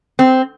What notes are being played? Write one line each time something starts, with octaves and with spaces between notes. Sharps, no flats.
C4